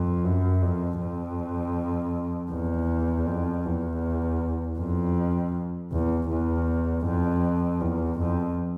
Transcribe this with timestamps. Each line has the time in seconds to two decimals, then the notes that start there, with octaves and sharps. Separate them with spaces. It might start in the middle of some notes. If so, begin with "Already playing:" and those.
Already playing: F2
0.24 F#2
0.62 F2
1.00 F2
2.52 E2
3.27 F2
3.65 E2
4.78 F2
5.93 E2
6.30 E2
7.06 F2
7.81 E2
8.20 F2